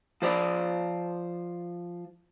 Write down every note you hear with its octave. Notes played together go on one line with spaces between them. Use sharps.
F3 C5 D5